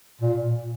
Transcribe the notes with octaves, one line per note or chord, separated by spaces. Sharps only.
A#2